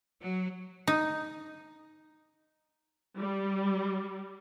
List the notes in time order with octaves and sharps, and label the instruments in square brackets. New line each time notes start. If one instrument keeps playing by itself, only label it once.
[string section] F#3
[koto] D#4
[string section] G3